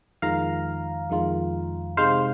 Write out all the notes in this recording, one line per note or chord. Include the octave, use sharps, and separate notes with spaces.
F2 D#3 G#3 F4 F5 A#5
F2 D#3 G#3 F4
C3 G#3 D#4 C5 F5